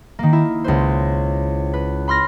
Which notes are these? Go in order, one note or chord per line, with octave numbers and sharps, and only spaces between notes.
D#3 A#3
E4
C#2 B4 C5
B4
B5 C6 F6 A#6